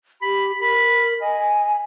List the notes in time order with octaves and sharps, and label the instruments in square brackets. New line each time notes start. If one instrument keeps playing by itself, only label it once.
[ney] G4 [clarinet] B5
[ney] A#4 [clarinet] B5
[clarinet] D#5 [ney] G#5